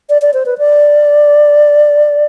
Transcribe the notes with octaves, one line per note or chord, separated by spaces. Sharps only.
D5
D5
C5
B4
D5